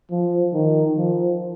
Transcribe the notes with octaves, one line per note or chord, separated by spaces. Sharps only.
F3
D#3
F3